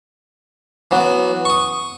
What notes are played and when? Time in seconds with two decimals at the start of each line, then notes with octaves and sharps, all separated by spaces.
0.91 E3 F#3 B3
1.45 C#6 D#6